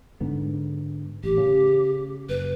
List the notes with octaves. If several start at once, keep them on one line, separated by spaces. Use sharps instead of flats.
G#2 D3 B3
A1 G4
C#3
F#1 B4